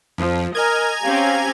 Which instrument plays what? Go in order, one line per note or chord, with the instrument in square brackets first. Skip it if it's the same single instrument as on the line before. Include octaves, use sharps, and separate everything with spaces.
[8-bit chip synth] F2 [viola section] F3
[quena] A#4 [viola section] D#5 [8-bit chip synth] G#5 A#5 G#6
[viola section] C4 C#4 G4 [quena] F5